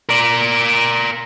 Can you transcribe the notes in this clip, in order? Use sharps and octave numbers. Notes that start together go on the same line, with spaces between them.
A#4 D5